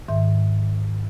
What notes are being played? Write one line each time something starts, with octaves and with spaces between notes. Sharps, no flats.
G#2 D#3 E5